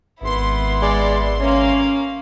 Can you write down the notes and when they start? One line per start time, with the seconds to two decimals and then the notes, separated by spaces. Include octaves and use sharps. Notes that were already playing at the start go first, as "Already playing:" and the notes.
0.21 G#1 B3 E4 C6
0.82 G#3 D5
1.40 A#3 C#4 F5